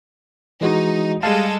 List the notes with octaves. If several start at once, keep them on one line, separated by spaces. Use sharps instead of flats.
E3 G#3 D#4 F#4
G3 G#3 A4 F5 A5